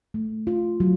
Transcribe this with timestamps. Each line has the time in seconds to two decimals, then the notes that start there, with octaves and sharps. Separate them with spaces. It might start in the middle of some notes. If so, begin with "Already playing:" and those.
0.14 A3
0.47 F4
0.80 F#3